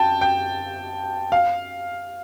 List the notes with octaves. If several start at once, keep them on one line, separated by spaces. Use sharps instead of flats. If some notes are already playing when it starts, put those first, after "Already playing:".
Already playing: G5 A5
G5
F5